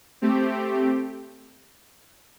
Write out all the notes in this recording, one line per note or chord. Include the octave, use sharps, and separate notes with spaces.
A3 C4 G4